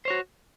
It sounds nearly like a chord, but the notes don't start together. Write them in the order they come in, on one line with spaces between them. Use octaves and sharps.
C5 C#5 F#4